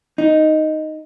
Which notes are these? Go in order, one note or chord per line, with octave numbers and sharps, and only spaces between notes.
D#4